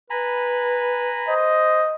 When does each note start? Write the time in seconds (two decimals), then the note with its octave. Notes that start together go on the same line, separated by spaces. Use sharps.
0.10 B4 G#5 A#5 B5
1.28 C5 D#5